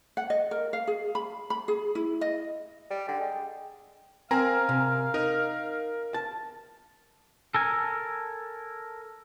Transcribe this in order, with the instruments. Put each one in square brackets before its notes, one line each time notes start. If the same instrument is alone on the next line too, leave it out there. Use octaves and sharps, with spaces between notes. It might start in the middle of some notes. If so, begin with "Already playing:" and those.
[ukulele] F#5
D#5
A#4
F5
G#4
B5
B5
G#4
E4
D#5
[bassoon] G3
[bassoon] D3 [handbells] G5
[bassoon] G#3
[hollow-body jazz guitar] C4 [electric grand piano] A#4 G#5 A#5 [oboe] F5
[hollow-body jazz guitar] C3
[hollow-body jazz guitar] D#4 [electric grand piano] A#4
[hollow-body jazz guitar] A5
[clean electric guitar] A4 A#4 G#5